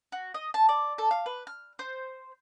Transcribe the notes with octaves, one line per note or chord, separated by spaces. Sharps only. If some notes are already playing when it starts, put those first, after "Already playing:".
F#4
D#5
A5
D5
A4
F5
B4
F6
C5